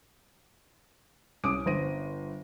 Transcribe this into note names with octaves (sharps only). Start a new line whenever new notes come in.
C2 C#4 D6 D#6 D7
G1 C5 A#6 D#7